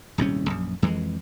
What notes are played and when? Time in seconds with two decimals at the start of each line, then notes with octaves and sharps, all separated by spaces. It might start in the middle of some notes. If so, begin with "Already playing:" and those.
0.18 D#1 C2 G#2 C#4
0.47 A#1 F#2
0.82 F2 E3 G3 G#3